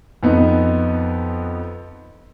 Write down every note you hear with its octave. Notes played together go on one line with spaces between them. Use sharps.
F2 B3 D#4